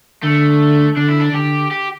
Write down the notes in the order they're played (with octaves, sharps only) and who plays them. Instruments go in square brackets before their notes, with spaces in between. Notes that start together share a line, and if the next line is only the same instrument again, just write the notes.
[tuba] D3 [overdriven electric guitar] A3
[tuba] D3 [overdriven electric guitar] D4
[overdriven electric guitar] E4
D4
[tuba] D3 [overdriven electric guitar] G4
[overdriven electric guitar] G4